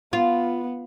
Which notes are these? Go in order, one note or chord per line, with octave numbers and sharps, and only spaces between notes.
B3 F4